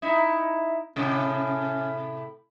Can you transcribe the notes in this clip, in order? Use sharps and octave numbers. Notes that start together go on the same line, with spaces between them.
D#4 E4
A2 C3 C#4